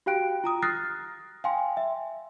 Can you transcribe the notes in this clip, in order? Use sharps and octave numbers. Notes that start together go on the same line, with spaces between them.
F#4 G4 F5 G5 F#6 D7
F4 A#5 D#6
D#6 F6 F#6 A6 A#6 C7
F5 G5 G#5 C6
E5